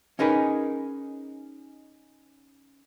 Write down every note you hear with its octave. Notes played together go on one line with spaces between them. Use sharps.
C#4 D#4 G#4 A#4 B4